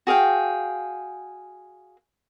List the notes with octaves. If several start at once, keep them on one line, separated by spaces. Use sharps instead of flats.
F#4 G#4 F5 G5